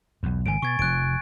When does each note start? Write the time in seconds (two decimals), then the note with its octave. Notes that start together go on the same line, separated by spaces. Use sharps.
0.23 B1 E2
0.46 G#1 G#2 C#3 G#5 D7
0.62 B2 C#6 G#6 A6
0.79 F1 B2 F3 F#6 D7